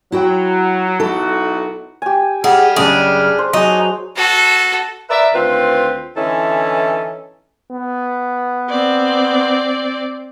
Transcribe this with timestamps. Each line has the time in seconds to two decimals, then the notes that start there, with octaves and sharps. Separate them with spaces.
0.12 F#3 E4 F#4 G5
1.00 B1 D#4 E4 F#4 A4
2.02 G4 G#5
2.44 G3 G#4 F#5 F6
2.76 F#2 C#3 D4 G#4 D#5 D6
3.39 C5
3.53 F#3 D#4 F#4 G#4
4.16 F#4 A4
5.10 A#4 B4 D5 E5
5.34 D2 D#3 C4 F4 B4
6.17 D3 E3 C#4 D#4 E4 A4
7.71 B3
8.70 C4 D5